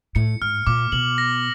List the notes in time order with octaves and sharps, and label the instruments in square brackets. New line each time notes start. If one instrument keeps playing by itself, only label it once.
[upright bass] A2 [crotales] C#7
[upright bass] G#2 [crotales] F6
[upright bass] A#2 [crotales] D6
[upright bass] B2 [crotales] F#7
[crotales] A#6